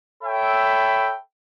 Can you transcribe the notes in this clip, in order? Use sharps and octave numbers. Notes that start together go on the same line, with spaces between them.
A4 C#5 E5 G5 B5